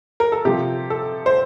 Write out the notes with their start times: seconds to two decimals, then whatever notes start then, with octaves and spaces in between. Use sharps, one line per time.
0.20 A#4
0.32 A4
0.45 C3 F3 G4
0.90 A4
1.26 C5